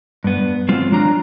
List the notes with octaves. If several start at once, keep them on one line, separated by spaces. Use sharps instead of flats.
G2 B3
F#3 G#3 C4 F4
F#3 D4 F4 A#5